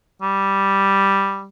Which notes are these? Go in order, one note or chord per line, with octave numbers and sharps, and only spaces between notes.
G3